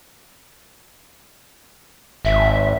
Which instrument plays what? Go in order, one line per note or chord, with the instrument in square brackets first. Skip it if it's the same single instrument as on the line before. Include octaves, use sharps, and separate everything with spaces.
[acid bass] G#1 [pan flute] E5